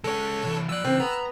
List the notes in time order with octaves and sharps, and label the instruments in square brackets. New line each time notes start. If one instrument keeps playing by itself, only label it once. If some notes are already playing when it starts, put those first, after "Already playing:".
[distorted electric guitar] G#3 C#4 [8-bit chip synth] A4 C#5
[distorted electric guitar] C2 E3
[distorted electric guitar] F3 D5 [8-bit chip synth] E6 F#6
[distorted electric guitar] C#3 E3 [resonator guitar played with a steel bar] C4
[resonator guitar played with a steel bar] B3 [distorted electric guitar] A#5